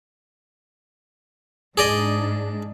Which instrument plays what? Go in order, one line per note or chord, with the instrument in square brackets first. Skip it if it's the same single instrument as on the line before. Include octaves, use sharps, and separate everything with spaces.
[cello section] G#2 D4 [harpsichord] G#4 D5 D#5